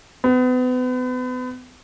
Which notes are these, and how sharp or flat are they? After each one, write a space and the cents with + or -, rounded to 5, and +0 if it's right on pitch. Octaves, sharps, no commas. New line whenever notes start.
B3 +35